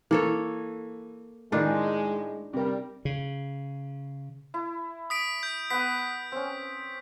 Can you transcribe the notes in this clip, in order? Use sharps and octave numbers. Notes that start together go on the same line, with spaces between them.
E3 A#3 A4 C#5
A2 D#3 G#3 D4 D#4 F4
C3 G3 A#4
C#3
E4
D#6 B6 D7
G6
B3 F#5 D#6 B6
C4 C#4